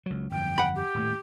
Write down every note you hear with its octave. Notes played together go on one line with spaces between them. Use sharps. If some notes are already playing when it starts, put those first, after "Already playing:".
C#2 F#3
G1 F2 G5
F#5 B5
G4
D#1 A2 A3